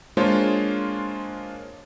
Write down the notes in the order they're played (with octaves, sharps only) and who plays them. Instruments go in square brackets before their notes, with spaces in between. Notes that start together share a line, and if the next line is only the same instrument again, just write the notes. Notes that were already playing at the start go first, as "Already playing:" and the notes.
[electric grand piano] G#3 A#3 D4 F4 C5 C#5